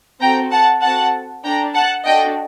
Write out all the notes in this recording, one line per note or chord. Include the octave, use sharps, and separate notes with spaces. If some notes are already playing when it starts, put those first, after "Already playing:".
C4 F#4 A4 G5 A#5
F#5 A5
C4 F#4 A4 F#5 A5
D4 A4 G5 A#5
F#5 A5
D4 F#4 A4 D#5 G5